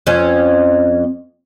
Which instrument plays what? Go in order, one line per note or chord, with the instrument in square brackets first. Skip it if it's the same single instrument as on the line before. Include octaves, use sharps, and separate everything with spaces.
[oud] F2 C#4